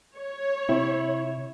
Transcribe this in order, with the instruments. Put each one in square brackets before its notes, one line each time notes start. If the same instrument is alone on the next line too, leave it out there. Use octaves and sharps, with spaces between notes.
[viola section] C#5
[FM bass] C3 [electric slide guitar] E4